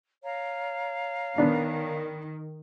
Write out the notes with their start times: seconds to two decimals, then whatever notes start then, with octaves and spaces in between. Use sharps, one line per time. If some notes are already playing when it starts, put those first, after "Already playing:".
0.24 C#5 F5 A#5
1.38 D#3 B3 D4